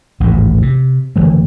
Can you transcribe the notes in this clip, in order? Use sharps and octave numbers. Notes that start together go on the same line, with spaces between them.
A1 D#2 G#2
C3
F#1 D3 E3 A3